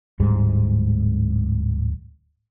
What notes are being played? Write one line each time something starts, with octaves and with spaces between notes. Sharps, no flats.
D1 G#2 G3 G#3